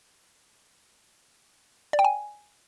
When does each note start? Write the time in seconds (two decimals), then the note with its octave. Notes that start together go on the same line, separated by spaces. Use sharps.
1.93 D5
1.99 G5
2.04 G#5